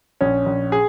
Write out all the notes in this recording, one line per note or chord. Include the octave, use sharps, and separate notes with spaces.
A#1 C#4
A#1
G#4